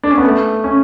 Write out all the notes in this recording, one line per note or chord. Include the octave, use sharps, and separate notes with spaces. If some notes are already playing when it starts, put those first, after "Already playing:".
D4
C#4
B3
A3
C#4